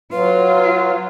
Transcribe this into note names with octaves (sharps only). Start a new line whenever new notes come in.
F#3 F4 B4